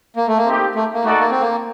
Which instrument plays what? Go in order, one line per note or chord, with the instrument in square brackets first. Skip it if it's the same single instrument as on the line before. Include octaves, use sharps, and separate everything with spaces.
[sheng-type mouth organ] A#3
A3
A#3
[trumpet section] C4 D#4 G4
[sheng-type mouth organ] A3
A#3
[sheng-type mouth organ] A3 [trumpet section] D#4 F#4 A4 D5
[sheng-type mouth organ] A#3
C4
A#3